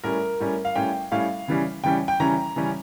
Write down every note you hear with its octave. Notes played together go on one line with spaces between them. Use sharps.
A2 G3 C#4 A#4
A2 G3 C#4
F5
A2 G3 C#4 G5
A2 G3 C#4 F5
C#3 E3 G3 C#4
C#3 E3 G3 C#4 G5
G5
C#3 E3 G3 C#4 A#5
C#3 E3 G3 C#4